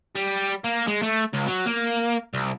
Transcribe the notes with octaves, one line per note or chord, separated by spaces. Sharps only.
G3
A#3
G#3
A3
C#2
F#3
A#3
C2